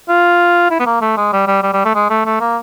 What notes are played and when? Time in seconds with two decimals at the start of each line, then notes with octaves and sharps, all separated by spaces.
0.09 F4
0.71 E4
0.80 B3
0.86 A#3
1.01 A3
1.17 G#3
1.33 G3
1.48 G3
1.63 G3
1.74 G3
1.85 A3
1.95 G#3
2.10 A3
2.26 A3
2.41 A#3